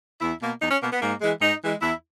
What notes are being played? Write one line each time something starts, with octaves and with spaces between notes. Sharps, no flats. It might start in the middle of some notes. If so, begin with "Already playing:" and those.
E2 E4
B2 A#3
E2 D#4
C#4
B2 A#3 B3
B3
G#2 A#3
E3 G#3
G#2 D#4
E3 G#3
E2 E4